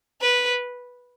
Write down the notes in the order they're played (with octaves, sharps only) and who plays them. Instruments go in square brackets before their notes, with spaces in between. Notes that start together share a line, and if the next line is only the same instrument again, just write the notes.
[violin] B4